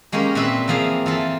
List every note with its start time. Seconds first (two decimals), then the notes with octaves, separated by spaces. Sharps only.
0.12 G#3 A#3 C#4 G4 A#4
0.35 A#2 C4 E4 B4 E5 C6
0.68 E3 F3 A#3 G#4 F5
1.06 E3 F4 A4 E5